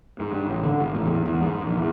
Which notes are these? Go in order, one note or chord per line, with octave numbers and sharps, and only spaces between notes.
G#2
G2
A1
D3
G#1
A1
E2
E2
G#2
A#1
E2